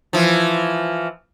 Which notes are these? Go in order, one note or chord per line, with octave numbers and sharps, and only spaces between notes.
E3 F3